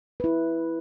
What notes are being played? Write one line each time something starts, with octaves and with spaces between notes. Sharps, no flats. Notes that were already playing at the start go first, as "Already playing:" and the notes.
E4 B4